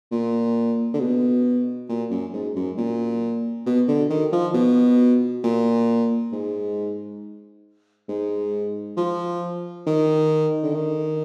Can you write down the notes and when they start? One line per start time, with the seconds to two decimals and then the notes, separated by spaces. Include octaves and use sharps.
0.11 A#2
0.94 D3
1.00 B2
1.89 A#2
2.11 F#2
2.33 G#2
2.56 F#2
2.77 A#2
3.66 B2
3.88 D3
4.10 D#3
4.32 F3
4.54 B2
5.44 A#2
6.32 G#2
8.09 G#2
8.97 F3
9.86 D#3
10.63 D3
10.74 D#3